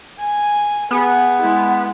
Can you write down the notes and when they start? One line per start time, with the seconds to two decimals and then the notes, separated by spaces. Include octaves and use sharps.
0.19 G#5
0.91 B3 G#4
1.41 G#3 E4